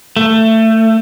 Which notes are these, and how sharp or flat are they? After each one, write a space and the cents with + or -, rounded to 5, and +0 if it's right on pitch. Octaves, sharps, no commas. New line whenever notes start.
A3 +20